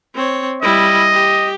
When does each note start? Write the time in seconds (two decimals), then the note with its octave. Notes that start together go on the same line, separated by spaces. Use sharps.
0.15 C4 C#5
0.62 G3 E4 D#5
1.14 G4